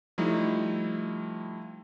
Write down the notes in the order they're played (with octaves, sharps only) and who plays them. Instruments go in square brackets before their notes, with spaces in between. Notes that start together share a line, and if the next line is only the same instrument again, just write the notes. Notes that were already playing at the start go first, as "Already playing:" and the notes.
[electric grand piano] F3 G3 A3 D#4 E4